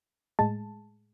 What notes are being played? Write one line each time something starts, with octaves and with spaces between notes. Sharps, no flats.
A2 G#3 A5